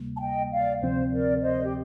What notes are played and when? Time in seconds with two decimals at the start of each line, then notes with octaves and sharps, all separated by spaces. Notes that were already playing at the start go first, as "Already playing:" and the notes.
Already playing: D2 C3 G3 A#3
0.16 A5
0.20 D#5 G5
0.51 D5 F5
0.82 D2 C3 F3 C4 C5
1.12 A#4 D5
1.42 C5 D#5
1.64 G4